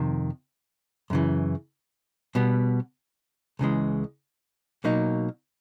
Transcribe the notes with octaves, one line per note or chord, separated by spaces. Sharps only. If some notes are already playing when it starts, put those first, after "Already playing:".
Already playing: F2 C3 D#3
F#2 C#3 E3
B2 G3 B3
C#2 C#3 E3 G#3
B2 F#3 A#3 D#4